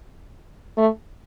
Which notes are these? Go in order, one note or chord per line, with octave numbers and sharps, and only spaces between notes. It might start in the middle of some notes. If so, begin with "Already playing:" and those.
A3